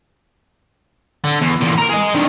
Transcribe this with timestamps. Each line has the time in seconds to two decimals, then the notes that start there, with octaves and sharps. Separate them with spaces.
1.24 D3
1.42 E2
1.61 E2 A#2
1.78 A#4 A#5
1.90 G#4 D#5
2.15 D#3 D4